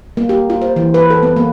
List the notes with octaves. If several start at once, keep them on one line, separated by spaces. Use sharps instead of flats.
A#3
G4
F4
C5
E3
B4
A4
B3
A#3